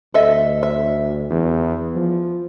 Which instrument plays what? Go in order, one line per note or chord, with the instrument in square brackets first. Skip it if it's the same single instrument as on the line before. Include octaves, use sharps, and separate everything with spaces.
[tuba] D2 [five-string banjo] A4 D#5 E5
[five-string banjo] E5
[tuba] E2
F3